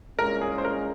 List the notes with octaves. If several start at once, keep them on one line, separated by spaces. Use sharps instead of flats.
C2 A#2 G#3 C#4 A#4
G#4
C5
A#4